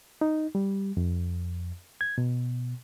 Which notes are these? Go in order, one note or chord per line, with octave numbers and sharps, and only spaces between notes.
D#4
G3
F2
G#6
B2